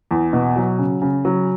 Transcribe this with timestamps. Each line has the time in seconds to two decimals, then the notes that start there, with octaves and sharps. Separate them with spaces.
0.11 E2
0.33 B2
0.56 F#3
0.79 C#3
1.02 C#3
1.25 F#3